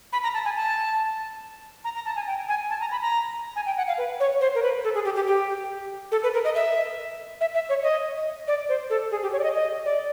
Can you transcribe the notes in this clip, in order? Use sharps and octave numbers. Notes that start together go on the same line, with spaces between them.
B5
A#5
A5
G#5
A5
A#5
A#5
A5
G#5
G5
G#5
A5
A#5
B5
A#5
G#5
G5
F#5
F5
B4
C#5
C5
A#4
B4
A4
G#4
G4
G4
G4
A4
B4
A#4
D#5
E5
E5
E5
C#5
D#5
D5
C5
A4
G#4
G4
C#5
D5
D#5
D#5
D5